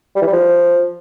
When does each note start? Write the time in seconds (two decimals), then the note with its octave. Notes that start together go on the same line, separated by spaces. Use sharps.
0.16 G3
0.22 E3
0.27 G3
0.33 F3